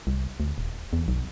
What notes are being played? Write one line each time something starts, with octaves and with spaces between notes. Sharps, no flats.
C2
D2
D#1
E2
B1